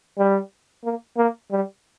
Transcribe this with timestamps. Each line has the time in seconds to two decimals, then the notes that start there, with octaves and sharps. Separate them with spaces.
0.18 G3
0.85 A#3
1.18 A#3
1.51 G3